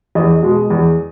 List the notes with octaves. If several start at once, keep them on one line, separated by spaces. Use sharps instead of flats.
E2 D#5
B2 G#3
E2